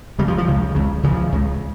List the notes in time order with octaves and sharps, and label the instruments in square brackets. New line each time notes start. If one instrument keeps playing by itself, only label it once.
[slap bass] F2 C#3 G3
F3
F3
C#2 C#3
C#2 C#3
C#2 C#3 F3
C#2 C#3